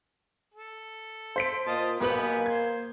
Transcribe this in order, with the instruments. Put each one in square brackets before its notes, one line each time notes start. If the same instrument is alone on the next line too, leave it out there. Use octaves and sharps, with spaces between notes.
[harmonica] A4
[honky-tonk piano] C5 B6 D7
[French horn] A#2 [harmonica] D#5 F5 A5
[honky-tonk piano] B1 B4 F#7 [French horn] A#3 [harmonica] B3 G4 G#4
[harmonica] C5 [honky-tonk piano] G#6